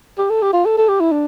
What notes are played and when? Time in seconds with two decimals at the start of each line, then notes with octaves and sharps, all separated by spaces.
0.18 G4
0.30 A4
0.42 G4
0.53 F4
0.66 A4
0.78 A4
0.89 G4
1.00 E4
1.12 D4